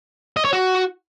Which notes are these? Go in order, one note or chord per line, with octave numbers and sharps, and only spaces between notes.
D#5
C#5
F#4